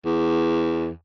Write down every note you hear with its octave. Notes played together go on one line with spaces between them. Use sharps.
E2